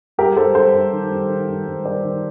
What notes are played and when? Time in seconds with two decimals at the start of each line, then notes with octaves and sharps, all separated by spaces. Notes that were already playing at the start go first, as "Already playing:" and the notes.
0.18 G2 G4 A#4
0.36 G2 A4 C5
0.55 G2 A4 C5
0.74 G2
0.93 D#3
1.11 G2
1.29 D#3
1.48 G2
1.67 G2
1.85 G2 A#4 D5
2.05 D#3